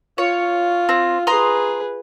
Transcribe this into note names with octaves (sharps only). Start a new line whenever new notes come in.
F4 C#5
C4
G#4 B4 A#5 C6 D#6